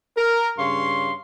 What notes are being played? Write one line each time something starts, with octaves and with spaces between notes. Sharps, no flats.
A#4
G2 C#3 C#5 F5 C6